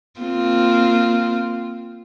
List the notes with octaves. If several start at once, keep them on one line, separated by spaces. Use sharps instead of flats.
A#3 C4 F4